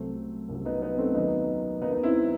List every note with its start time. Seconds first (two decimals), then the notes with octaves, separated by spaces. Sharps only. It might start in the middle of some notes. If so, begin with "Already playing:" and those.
Already playing: C2 C3 F#3 A3 C4
0.49 C2 C3 F#3
0.65 B3 D#4
0.82 B3 D#4
0.98 A3 C4
1.14 D#2 D#3 F#3 B3 D#4
1.81 D#2 D#3 F#3 B3 D#4
1.92 D#4
2.03 C4 E4